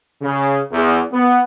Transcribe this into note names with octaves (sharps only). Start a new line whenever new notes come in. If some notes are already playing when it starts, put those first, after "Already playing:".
C#3
E2
B3